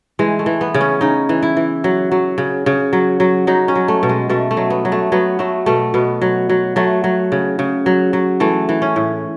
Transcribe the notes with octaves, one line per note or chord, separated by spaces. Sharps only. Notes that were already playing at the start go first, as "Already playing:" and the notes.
E3 G#3
A3
E3
B3
C#3
C#4
C#3 D#4
E3
E4
E3
F#3
F#3
C#3
C#3
F#3
F#3
F#3 D#4
C#4
F#3
A3
B2
G#3
B2 A3
A3
F#3
B3
F#3
A3
F#3 B3
F#3 A3
B2 A3
B2 B3
F#3
F#3
F#3 A3
F#3
C#3
C#3
F#3
F#3
E3 A3
E3
C#4
A2